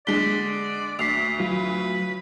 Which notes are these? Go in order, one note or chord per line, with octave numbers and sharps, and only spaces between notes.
D3 G#3 D5 B6 G7
D2 B6 C7 F7
F#3 F4 B4